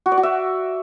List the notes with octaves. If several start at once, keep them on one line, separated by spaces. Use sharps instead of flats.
F#4
D5
F#4
E5